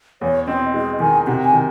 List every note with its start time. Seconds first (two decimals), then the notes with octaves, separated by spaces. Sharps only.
0.21 E2 C#5
0.47 C4 D#5
0.74 G#3 D#5
1.00 D#3 G#5
1.27 C3 F#5
1.44 G#5
1.53 D#3